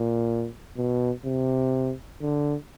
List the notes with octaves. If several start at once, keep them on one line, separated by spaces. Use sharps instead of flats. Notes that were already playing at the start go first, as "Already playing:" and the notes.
Already playing: A#2
B2
C3
D3